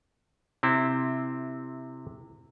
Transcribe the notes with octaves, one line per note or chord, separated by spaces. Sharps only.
C3 C4 E4